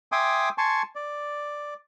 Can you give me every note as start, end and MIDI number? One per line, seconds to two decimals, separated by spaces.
0.12 0.49 76
0.12 0.49 79
0.12 0.49 80
0.12 0.49 84
0.12 0.49 86
0.12 0.49 87
0.58 0.82 80
0.58 0.82 81
0.58 0.82 84
0.58 0.82 85
0.95 1.74 74